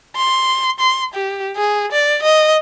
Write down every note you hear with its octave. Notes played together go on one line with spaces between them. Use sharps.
C6
C6
G4
G#4
D5
D#5